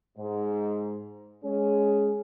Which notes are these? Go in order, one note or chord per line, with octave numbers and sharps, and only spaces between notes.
G#2
G#3 C#4 G#4